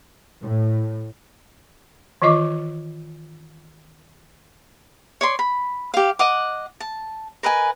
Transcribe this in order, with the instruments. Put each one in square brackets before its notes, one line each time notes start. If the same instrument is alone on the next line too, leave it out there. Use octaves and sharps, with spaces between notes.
[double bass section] A2
[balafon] D#3 E3 F4 D#5 C#6 D6
[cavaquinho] C#5 D5 C6
B5
G4 F5
D#5 F#5 D6
A5
A#4 B4 D#5 G#5